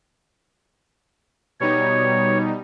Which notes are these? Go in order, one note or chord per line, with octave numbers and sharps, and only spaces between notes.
B2 G3 D#4 C#5